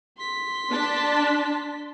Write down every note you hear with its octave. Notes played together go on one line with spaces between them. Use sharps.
C6 B6
D4 A5